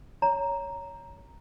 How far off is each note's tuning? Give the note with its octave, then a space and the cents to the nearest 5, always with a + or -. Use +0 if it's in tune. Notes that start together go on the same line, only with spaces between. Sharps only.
C#5 +10 A#5 +0